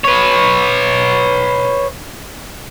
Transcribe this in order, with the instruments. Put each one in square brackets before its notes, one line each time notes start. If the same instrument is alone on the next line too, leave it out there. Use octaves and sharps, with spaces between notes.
[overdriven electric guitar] B4 C#5